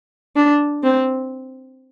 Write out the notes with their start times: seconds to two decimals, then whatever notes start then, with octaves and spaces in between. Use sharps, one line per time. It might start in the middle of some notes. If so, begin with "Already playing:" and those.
0.36 D4
0.83 C4